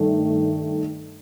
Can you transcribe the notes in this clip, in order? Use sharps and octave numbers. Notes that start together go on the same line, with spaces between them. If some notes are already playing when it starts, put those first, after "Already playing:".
Already playing: G2 D#3 A3